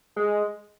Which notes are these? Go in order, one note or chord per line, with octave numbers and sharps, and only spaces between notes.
G#3